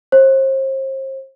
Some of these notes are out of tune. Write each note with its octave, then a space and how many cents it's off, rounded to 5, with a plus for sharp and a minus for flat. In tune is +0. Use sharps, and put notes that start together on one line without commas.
C5 +40